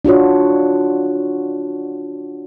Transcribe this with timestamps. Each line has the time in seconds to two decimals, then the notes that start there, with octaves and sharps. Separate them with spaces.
0.05 D4 F4 F#4 C#5